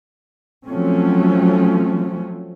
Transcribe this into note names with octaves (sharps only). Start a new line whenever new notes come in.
F3 F#3 A3 C4 C#4